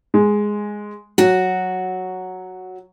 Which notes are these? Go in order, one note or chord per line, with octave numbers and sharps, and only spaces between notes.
G#3
F#3 F#4 F#5